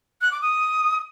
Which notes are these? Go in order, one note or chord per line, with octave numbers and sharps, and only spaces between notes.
F#6
D6
D#6